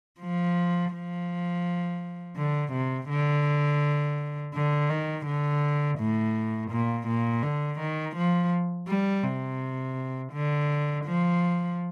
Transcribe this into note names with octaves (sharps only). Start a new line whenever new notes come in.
F3
F3
D3
C3
D3
D3
D#3
D3
A2
A#2
A#2
D3
D#3
F3
G3
C3
D3
F3